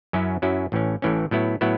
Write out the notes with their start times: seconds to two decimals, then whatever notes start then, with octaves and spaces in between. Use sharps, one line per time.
0.13 F#2 F#3 C#4 E4
0.42 F#2 F#3 C#4 E4
0.72 A1 A2 E3 C#4
1.02 A1 A2 E3 C#4
1.31 A2 F#3 B3 E4
1.61 A2 F#3 B3 E4